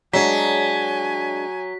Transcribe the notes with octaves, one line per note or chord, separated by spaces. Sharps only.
F#3 G#3 D4 G#5 B6